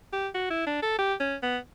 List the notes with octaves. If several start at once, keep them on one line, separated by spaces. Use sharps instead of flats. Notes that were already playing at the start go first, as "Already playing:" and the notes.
G4
F#4
E4
D4
A4
G4
C#4
B3